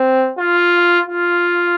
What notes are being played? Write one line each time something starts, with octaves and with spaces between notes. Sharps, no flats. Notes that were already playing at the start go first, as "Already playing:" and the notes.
Already playing: C4
F4
F4